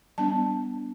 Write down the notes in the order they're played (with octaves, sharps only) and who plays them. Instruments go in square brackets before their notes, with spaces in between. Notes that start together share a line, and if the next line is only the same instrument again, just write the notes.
[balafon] G3 B3 D4 A5